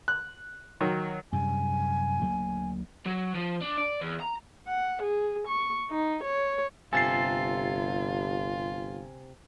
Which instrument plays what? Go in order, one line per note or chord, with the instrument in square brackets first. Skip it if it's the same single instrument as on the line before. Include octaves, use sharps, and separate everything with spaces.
[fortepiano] F#6
D#3 F#3
[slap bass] F#2 C3 G3 [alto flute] G#5
[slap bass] D2 F#3 A#3
[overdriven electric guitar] F#3
F3
D4
D5
E2
A#5
[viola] F#5
G#4
C#6
D#4
C#5
[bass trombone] G1 [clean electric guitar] C3 A4 [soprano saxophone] F4 [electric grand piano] G#5 A6 C7